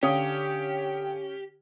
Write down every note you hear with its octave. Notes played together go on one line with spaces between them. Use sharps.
D3 C#4 G4 F5 G5 D#6